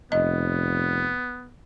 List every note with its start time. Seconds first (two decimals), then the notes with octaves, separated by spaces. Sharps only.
0.12 F1 B3 D#5